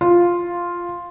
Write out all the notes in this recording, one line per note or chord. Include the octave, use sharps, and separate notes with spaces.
F4